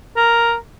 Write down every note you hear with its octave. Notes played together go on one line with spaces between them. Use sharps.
A#4